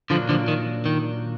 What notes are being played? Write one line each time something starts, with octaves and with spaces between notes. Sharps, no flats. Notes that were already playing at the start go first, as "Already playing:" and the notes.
A#2 D3 F3 F#3 D4 F4
D3 F3
D#3
D#3